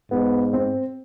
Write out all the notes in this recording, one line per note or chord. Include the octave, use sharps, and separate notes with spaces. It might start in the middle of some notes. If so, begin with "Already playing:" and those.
G#2 B3
C4